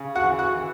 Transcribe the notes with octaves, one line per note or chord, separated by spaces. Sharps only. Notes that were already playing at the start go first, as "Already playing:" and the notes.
Already playing: C#3
F#4 F#5
E3
F#4 F#5
E3